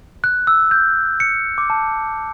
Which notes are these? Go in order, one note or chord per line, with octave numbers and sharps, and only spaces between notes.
F#6
E6
G6
C#7
D6
A5